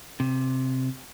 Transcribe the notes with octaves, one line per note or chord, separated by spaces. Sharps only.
C3